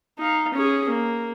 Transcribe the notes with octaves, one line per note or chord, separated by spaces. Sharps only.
D#4 F5
C#4 G#4
A#3